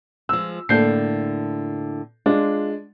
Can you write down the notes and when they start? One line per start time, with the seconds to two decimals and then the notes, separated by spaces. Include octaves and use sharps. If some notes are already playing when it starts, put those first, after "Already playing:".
0.29 F3 G#3 E6
0.69 A2 D3 A#3 A4 G6 C7
2.26 G#3 D4 F4